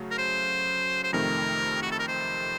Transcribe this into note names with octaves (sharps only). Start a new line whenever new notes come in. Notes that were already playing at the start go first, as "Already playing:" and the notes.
Already playing: C#3 F#3 A3
A#4
C5
C5
F2 C3 D#3 A3 A#4
F#4
A4
A#4
C5